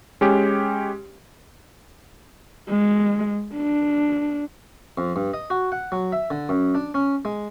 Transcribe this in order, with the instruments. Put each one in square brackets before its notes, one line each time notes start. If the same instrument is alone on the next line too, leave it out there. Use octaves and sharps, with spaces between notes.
[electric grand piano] G#3 C#4 G4
[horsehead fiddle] G#3
D4
[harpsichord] F2
G2
D#5
F#4
F#5
F#3
E5
D3
F#2
D4
C#4
G#3